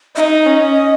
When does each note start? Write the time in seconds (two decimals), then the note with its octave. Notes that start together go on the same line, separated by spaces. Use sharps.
0.16 D#4 D#5 E5
0.45 C#4